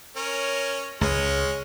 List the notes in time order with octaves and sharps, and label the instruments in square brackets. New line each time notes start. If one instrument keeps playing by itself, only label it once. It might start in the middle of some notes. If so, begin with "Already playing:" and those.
[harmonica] C#4 A#4 C#5
[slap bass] C#2 [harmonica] G#3 C#4 C#5